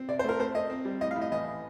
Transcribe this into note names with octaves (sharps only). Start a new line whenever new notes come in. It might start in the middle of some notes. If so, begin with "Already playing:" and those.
Already playing: C4
C3 D5
C5
A3 A#4
A3 C5
A3 D#5
C4
G3
A2 D#5
F5
A2
D#5
A1 D#5